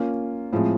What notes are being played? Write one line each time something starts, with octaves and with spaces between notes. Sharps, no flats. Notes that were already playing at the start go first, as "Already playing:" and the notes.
Already playing: A#3 C#4 F4
A2 F3 G#3 C4